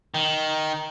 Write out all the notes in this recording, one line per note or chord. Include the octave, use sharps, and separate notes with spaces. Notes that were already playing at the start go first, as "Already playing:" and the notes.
D#3